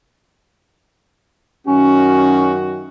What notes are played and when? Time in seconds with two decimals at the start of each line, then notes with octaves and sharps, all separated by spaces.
1.67 F#2 D#3 C#4 F#4